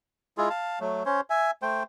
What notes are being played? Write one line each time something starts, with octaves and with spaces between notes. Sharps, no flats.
G#3 E4 F4 G#4
F5 A5
F#3 A3
C#4 C5 C#5
E5 G#5
A3 C5 G5